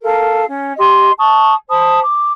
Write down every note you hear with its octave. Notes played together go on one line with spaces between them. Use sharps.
A4 A#4 F5
C#4
G4 D#5 C6
A5 C#6 D#6
C5 A5 B5 D#6
D6